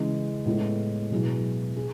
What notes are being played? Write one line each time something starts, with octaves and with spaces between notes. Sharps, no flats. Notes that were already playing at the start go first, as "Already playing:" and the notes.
Already playing: C#3 E3 G#3
A2 G#3 B3
B2 F#3 B3 E4 G#4
G#4